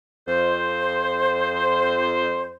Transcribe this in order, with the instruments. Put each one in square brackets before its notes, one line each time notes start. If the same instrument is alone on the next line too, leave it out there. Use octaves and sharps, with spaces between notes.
[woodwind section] F2 C5